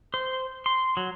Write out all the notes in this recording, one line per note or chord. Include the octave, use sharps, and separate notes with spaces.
C5
C6
F#3